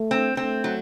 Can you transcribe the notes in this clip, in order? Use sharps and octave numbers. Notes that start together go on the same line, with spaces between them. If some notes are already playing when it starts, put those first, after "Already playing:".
Already playing: A3
C4
A3 C4
F#3